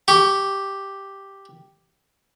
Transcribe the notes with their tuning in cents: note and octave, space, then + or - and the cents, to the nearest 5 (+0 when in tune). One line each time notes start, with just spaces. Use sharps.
G4 +0 C#6 +35